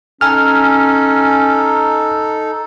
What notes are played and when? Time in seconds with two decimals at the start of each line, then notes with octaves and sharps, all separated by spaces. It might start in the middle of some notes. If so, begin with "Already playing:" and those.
0.21 C#4 D#4 A4 G#5 F6